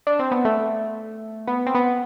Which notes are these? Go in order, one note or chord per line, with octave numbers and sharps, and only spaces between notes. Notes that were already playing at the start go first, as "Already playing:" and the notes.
D4
C4
B3
A3
B3
C4
B3